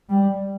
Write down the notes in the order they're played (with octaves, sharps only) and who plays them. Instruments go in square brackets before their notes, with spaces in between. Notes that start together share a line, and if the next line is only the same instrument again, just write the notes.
[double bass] G3